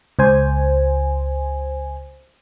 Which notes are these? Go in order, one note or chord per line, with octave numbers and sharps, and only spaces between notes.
C#2 C5 G#5